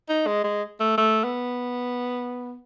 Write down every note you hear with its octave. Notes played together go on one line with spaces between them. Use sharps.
D#4
G#3
G#3
A3
A3
B3